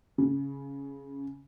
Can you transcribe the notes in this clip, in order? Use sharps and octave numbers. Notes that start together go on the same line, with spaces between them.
C#3